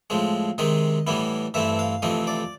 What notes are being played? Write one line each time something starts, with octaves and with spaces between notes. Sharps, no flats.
A2 F3 G#3 C4
C3 D#3 G#3 C4 D#5
A2 E3 G3 B3 E4
G2 E3 A3 C4 E4 E5
F5
F2 C3 E3 A3 C4 D#5
D5